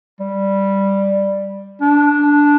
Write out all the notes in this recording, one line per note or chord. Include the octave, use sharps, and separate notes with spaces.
G3
D4